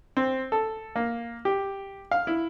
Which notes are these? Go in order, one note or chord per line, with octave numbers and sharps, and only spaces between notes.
C4
A4
A#3
G4
F5
E4